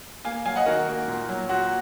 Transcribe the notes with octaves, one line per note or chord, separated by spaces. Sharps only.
A#3 F5 G#5
F#3 F5 G#5
D#5 F#5
D#3 F#4 A#4
A#3
A#2
F#3
A#2 F#4